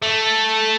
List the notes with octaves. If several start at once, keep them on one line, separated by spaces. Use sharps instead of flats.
A3